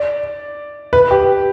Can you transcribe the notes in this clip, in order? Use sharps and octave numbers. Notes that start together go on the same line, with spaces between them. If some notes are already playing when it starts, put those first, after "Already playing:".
Already playing: D5
B4
G4